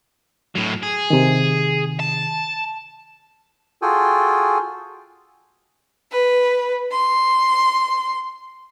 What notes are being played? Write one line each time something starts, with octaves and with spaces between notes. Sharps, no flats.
A2 F#3
G#4
C3 D#3
A5
F4 F#4 G#4 A4 G5 G#5
B4
C6